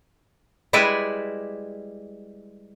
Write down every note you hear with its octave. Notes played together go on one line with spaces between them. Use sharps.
G3 G#3 E4 B4 D5 E5